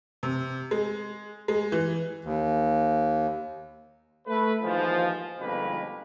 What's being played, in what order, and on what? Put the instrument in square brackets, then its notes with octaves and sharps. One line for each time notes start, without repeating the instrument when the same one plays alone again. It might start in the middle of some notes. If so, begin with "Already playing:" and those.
[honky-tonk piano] C3
G#3
G#3
E3
[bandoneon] D#2
[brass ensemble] A3 A4 B4
D#2 G#2 E3 F3
G1 F2 G#2 B2 A#3 B4